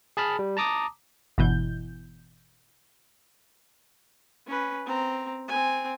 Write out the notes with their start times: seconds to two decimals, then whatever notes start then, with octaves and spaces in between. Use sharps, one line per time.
0.17 G#4 A5 B5 F6
0.39 G3
0.57 A5 A#5 D6 D#6
1.38 G1 B2 E3 G6
4.47 C#4 B4
4.86 C4 A#5
5.48 C4 G#5